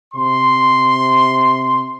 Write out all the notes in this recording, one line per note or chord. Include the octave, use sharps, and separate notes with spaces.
C3 C6